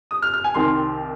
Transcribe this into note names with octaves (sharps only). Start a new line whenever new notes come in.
D#6
F6
F6
G#5
C2 C3 D#3 C6